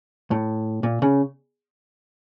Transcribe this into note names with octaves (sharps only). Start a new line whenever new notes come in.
A2
A#2
C#3